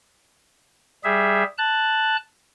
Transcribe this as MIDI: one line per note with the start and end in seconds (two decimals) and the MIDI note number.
1.04 1.43 55
1.04 1.43 68
1.04 1.43 76
1.58 2.17 81
1.58 2.17 90